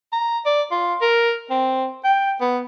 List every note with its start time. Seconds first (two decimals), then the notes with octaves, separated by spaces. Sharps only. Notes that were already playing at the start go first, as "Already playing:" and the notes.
0.13 A#5
0.46 D5
0.71 F4
1.01 A#4
1.51 C4
2.04 G5
2.41 B3